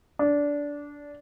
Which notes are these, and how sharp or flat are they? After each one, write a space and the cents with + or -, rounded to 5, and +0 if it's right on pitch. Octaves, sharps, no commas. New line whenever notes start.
D4 -15